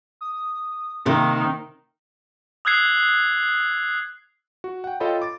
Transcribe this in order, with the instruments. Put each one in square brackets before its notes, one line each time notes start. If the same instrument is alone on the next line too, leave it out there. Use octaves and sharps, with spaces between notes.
[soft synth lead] D#6
[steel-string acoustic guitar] C3 [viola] D#3 [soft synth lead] A#3
[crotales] D#6 E6 F#6 G#6 C7
[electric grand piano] F#4
F#5 G5
F4 A4 C#5 D#5 G5 B5
D6 A6